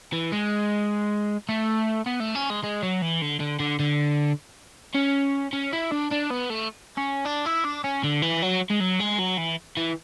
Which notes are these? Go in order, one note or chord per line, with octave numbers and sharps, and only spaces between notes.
E3
G#3
A3
B3
A3
C#4
G#3
G#3
F#3
E3
D3
D3
D3
D3
C#4
C#4
E4
D4
D4
B3
A3
C#4
D4
E4
D4
C#4
D3
E3
F#3
G#3
F#3
G#3
F#3
E3
E3